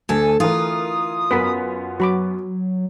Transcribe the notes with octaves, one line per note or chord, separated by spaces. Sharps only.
D2 A4 G#5
E3 F4 A#4 D#6
F#2 B3 A#4 B4 B6
F#3 F#4 B5 D6